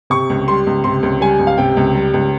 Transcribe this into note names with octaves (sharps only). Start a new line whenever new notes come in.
C3 C#6
C#2
G3 C6
C#2
C3 C6
C#2
G3 G#5
C#2
F5
C3 G5
C#2
G3
C#2